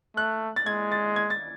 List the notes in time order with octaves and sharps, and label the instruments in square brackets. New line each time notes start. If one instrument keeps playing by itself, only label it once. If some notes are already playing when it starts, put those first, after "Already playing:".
[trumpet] A3 [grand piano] F#6
[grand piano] A6
[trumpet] G#3 [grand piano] G#6
[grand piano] A6
G#6
A6